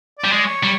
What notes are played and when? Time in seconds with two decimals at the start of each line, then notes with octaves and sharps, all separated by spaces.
0.19 D5
0.24 G3
0.31 G#3 D5
0.45 C#5
0.63 G3